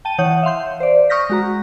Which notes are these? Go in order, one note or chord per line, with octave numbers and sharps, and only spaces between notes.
G5 A5 D#7
E3 C#5 F#5 D#6 G6
E5 F5 C6 G6
C5 D5
C#6 D#6 F6 G6 A#6 B6
G#3 F#4 A#5